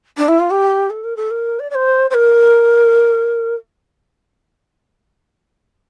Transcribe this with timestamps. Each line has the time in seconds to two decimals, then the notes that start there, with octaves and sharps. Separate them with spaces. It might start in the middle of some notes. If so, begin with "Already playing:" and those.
0.17 D4
0.28 E4
0.39 F4
0.50 G4
0.90 A4
1.03 A#4
1.16 A4
1.30 A#4
1.59 D5
1.70 D5
1.74 C5
2.10 C5
2.14 A#4